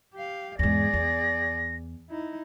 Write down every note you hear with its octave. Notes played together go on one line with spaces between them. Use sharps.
G4 F5
E2 G#2 G#4 D5 A#6
E2
D#4 E4